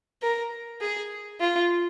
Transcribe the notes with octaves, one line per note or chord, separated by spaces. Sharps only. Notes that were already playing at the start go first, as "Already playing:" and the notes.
A#4
G#4
F4